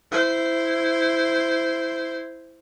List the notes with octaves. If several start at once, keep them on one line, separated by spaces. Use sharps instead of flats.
E4 C5